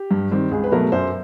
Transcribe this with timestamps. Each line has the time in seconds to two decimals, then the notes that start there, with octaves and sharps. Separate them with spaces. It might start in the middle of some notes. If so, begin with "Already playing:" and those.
Already playing: G4
0.11 G2
0.31 D#3 G3 C4
0.51 C#2 G#4
0.64 B4
0.72 B2 F#3 A3 A#4
0.92 F#2 C5